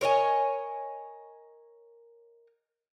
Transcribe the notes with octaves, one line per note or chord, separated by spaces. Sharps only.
A#4 C#5 D#5 G#5